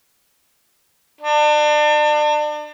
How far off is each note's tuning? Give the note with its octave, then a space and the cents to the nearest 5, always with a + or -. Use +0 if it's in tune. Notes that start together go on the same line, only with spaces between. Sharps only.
D4 +35